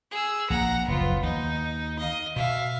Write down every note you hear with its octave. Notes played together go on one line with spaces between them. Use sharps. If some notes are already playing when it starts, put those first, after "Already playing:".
G#4 E6
A#1 A#3 F#5 A#5
F#1 D2 F3 B3 F4
D#2 D#4
D#5 F5
B2 E5 F5